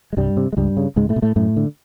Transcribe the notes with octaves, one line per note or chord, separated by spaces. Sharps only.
G#3
C2 G2 G3
C3
G#3
C#2 G2 G3
C#3
C#2 G#2 G#3
A2 A3
B2
A2 A3
F#2 A2 A3
D3